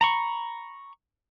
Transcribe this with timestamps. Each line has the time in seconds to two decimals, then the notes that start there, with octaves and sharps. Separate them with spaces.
0.01 A#5 B5 C#6